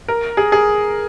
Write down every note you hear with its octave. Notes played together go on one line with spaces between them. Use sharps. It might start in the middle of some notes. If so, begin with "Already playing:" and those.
A#4
G#4
G#4